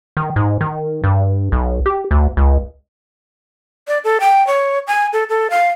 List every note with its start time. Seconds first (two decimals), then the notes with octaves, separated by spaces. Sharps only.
0.17 D#3
0.36 G#2
0.61 D#3
1.04 G2
1.52 B1
1.86 G4
2.11 D2
2.37 C#2
3.88 D5
4.04 A4
4.20 G5
4.47 C#5
4.87 G#5
5.13 A4
5.29 A4
5.50 F5